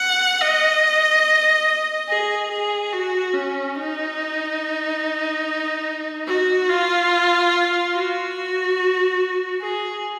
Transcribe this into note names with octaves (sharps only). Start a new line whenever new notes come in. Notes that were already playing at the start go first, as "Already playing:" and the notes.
Already playing: F#5
D#5
G#4
G#4
F#4
C#4
D#4
F#4
F4
F#4
G#4